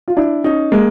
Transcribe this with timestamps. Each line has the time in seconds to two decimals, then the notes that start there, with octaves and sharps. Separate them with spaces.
0.08 F4
0.17 D4 E4
0.44 C#4 D#4
0.72 G#3 A#3